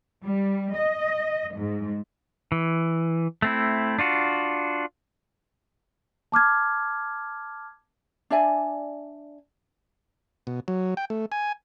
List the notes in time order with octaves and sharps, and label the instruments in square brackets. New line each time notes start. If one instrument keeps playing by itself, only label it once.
[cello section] G3
D#5
G#2
[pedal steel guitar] E3
A3 C4 E4
D4 F4 F#4
[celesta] A5 D6 F6 G#6
[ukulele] D4 D5 E5 G#5
[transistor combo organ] B2
F#3
G5
A3
G#5